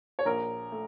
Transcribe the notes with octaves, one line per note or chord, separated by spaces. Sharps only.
C#5
A#1 A#4
A3